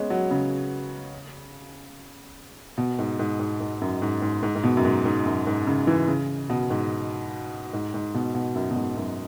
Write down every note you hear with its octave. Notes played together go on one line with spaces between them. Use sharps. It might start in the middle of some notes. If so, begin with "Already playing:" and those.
Already playing: G#3 B3 C#4
F#3
C#3
B2
G#2
G#2
G#2
G#2
F#2
G#2
G#2
G#2
G#2
B2
F#2
G#2
G#2
F#2
G#2
C#3
E3
C#3
B2
G#2
G#2
G#2
B2
B2
F#2
B2
G#2
F#2